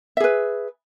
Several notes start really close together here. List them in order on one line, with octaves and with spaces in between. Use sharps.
E5 G#4 B4